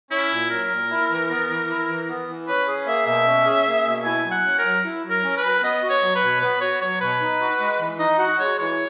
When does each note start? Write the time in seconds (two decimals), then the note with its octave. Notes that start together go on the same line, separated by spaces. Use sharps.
0.11 C#4 E4
0.31 A#2
0.50 F#3 A#4
0.70 A#2
0.91 E4
1.10 E3
1.30 B3
1.49 E3
1.68 E4
1.89 E3
2.09 B3
2.28 E3
2.48 C#4 B4
2.68 G#4
2.87 A#3 E5
3.06 B2 E5
3.26 C#4
3.46 G#4
3.67 A#3
3.86 B2
4.05 E4 G#5
4.25 F#3
4.31 F#5
4.45 C#4
4.58 A#4
4.64 F#3
4.85 E4
5.04 F#3
5.10 A#4
5.24 C#4
5.37 B4
5.44 F#3
5.62 B3 D#5
5.83 F#4
5.90 C#5
6.02 F#3
6.15 B4
6.23 B2
6.41 B3 B4
6.61 F#4 C#5
6.81 F#3 C#5
7.01 B2 B4
7.21 D#4
7.41 F#4
7.60 G#3
7.79 E3
7.99 D#4 D#5
8.19 F#4 F#5
8.39 G#3 C#5
8.59 E3 C#5